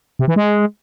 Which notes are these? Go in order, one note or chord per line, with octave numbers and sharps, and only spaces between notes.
C3
E3
G#3